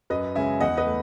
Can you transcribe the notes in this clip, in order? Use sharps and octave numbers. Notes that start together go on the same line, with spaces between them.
F#2 B4 D#5
C#3 G#3 C#4 E5 G#5
E2 D#5 F#5
B4 D#5
A3